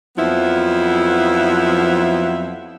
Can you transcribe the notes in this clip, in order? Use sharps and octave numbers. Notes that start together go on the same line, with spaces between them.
F2 F3 F#3 B3 E4 E5